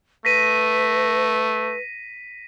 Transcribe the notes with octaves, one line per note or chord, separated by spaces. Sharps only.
A3 B4 A#6 B6 D#7